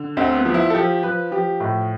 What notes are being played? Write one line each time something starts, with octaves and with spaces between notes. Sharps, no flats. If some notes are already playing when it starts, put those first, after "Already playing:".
Already playing: D3
D2 C4
B3
F3
E4
A4
F3 G4
F3 B4
F3 G4
A2